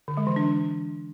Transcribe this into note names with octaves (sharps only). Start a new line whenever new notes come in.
D3
G#3
E3
D4